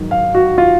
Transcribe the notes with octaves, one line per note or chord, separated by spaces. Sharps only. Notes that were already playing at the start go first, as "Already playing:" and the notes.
Already playing: G#2 D#3 F#3
F5
F#4
F4